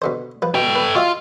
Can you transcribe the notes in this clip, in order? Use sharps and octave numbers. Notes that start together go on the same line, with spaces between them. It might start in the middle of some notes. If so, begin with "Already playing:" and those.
B2 D3 C5
F3 B4
B2 A4 G5
B4
F4 F#4 D#5 E5